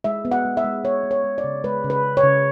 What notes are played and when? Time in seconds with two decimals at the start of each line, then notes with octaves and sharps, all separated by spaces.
0.04 G#3 E5
0.25 B3
0.32 F#5
0.45 G#3
0.57 E5
0.65 G#3
0.84 B3 C#5
1.04 B3
1.11 C#5
1.24 G#3
1.38 D5
1.44 C#3
1.64 G#3 B4
1.84 C#3
1.90 B4
2.04 G#3
2.17 C#5
2.23 C#3